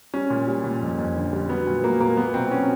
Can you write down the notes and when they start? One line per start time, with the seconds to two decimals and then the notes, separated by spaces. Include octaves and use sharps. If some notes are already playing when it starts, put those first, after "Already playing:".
0.14 G3 C#4
0.30 A#2
0.48 G3
0.64 A#2
0.81 F2
0.98 F2
1.16 D3
1.33 G3
1.49 F#3 B3
1.67 A#2
1.83 F#3 A#3
2.00 A#2 A#3
2.17 F#3 B3
2.34 B2 C4
2.51 F#3 C#4